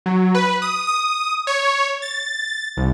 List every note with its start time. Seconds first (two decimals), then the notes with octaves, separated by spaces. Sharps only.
0.06 F#3
0.35 B4
0.62 D#6
0.87 D#6
1.47 C#5
2.02 A6
2.77 C2